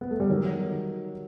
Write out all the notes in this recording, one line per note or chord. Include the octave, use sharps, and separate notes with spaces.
B3
A3
G3
D#3 F#3